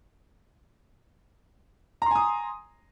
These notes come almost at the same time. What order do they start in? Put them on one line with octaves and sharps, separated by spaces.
A#5 C6 G#5 D#6